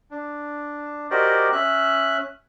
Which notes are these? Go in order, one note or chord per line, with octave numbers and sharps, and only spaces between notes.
D4
F#4 G4 A#4 C5 D5 D#5
C#4 E5 F#6